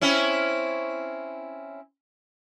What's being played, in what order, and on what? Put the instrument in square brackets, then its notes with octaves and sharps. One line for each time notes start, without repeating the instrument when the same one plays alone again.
[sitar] C4 C#4 E4